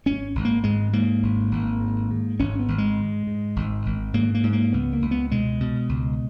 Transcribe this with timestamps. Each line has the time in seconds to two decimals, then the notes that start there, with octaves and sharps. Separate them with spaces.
0.06 G#1 C#4
0.35 G#1
0.45 A#3
0.64 G#2 G#3
0.93 G#2 A#3
1.23 G#1
1.51 G#1
1.80 G#2
2.11 G#2
2.39 G#1 C#4
2.59 B3
2.68 G#1
2.78 G#3
2.98 G#2
3.27 G#2
3.56 G#1
3.86 G#1
4.14 G#2 A#3
4.35 A#3
4.43 G#2
4.53 A#3
4.72 C#2 B3
4.93 A#3
5.02 C#2
5.11 B3
5.31 B2 G#3
5.60 B2
5.89 C#2